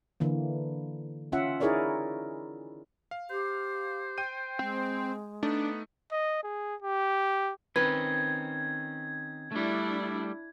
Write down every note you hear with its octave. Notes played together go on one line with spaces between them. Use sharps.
D3 E3 A#3
C#4 F4 E5 F#5
D#4 E4 G#4 A#4 C#5 D5
F5
G4 C5
G5 G6 D#7
G#3 C4
A3 B3 D4 D#4
D#5
G#4
G4
D#3 C4 C#4 B4 G#6
G3 A3 D4 E4